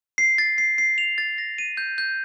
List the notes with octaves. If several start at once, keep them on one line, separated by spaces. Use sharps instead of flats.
C7
A6
C7
C7
F7
A6
A#6
D#7
G6
G6